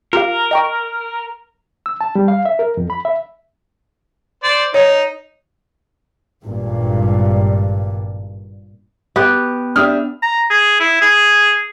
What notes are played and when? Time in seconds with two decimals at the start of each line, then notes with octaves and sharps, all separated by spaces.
0.13 F4 G4 A#4 F5
0.51 D#5 G5 C#6
1.86 E6
2.01 A5
2.15 G3
2.28 F5
2.45 E5
2.59 A#4
2.77 F2
2.90 B5
3.05 E5
4.43 C5 D5
4.74 D#4 C#5
6.43 G#1 G2 A#2
9.16 B3 G4
9.76 D4 G4 E5 D#6 F6
10.22 A#5
10.50 G#4
10.80 E4
11.01 G#4